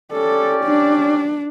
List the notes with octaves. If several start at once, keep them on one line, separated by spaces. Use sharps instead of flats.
C#4 G4 A4 D5
D4